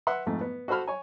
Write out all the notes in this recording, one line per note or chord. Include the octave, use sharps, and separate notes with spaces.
B4 E5 F#5 C6
F2 G#2 A3
B3
F#4 A4 C5 B5 F6
C#5 G#5